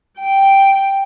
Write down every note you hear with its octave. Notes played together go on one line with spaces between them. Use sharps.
G5